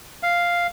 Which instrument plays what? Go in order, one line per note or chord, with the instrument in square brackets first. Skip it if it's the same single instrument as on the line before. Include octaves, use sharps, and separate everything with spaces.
[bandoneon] F5